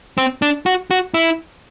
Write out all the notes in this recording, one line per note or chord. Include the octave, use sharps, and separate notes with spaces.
C4
D4
F#4
F#4
E4